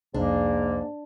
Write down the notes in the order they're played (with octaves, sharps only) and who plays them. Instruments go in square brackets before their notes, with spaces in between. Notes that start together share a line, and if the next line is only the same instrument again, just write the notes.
[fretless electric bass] C2 F2 [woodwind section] G#2 A#3 [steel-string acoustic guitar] D4